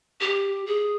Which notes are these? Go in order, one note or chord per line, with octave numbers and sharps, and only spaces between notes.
G4
G#4